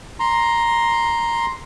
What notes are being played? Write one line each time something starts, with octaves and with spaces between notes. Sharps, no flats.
A#5 C6